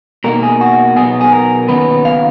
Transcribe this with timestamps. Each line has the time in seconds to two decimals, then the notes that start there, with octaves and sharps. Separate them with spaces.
0.24 B2 A#3 D#4 A#4
0.43 G#4
0.61 F#4
0.97 B2 F#3 B3 D#4 G#4
1.21 G#4
1.32 A#4
1.68 D#2 C#3 F#3 B3 D#4 B4
2.05 F5